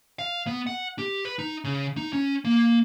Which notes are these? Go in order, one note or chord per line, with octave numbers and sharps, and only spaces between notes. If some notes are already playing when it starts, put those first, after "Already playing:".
F5
B3
F#5
G4
B4
D#4
C#3
D#4
C#4
A#3